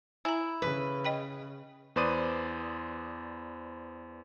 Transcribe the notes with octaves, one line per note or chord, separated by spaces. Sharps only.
E4 G#5 A#5
C#3 B4
D#5 G5 B5
E2 B4 C5 D5 D#6 D#7